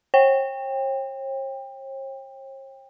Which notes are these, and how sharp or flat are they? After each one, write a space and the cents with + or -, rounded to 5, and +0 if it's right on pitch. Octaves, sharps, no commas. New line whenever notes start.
C#5 -45 G5 +20